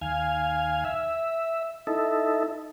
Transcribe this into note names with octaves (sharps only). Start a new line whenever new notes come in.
D#2 F5 G#5
E5
D#4 E4 A4